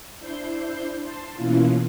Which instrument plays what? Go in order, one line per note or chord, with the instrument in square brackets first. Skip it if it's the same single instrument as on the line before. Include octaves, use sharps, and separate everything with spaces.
[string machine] D4 E4 C5 C6 G6
A5 C6
B2 E3 A#3 C#4 E4 F4